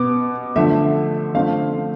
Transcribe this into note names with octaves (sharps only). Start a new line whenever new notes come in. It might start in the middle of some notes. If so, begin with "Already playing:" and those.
Already playing: B2 B3 D6
D3 F3 A3 E5
D3 F3 A3 C4 F5